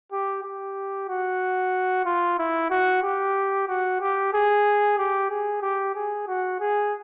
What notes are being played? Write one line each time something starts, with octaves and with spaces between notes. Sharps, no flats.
G4
G4
F#4
F4
E4
F#4
G4
F#4
G4
G#4
G4
G#4
G4
G#4
F#4
G#4